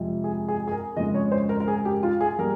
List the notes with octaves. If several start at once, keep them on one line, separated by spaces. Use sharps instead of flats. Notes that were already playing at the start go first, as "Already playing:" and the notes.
Already playing: F2 C3 F3 G#3
G#4
G#4
G#4
A#4
F2 C#3 G#3 D#5
C#5
C5
A#4
A#4
G#4
G4
F4
G#4
G3 A#3 A#4